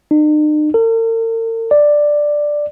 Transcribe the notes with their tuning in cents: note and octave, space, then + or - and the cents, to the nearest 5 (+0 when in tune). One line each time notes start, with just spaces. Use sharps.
D#4 -45
A#4 -45
D5 +5